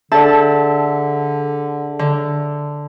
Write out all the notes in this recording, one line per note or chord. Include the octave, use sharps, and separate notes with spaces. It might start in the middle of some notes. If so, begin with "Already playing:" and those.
D3 D4 G#4 A4 D5 E5 A5
D3